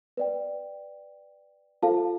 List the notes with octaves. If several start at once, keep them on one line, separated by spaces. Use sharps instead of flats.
B4 D5 G5
F4 A4 C5 F5 A5